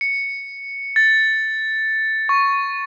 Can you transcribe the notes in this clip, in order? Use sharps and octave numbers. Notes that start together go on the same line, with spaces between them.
C#7
A6
C#6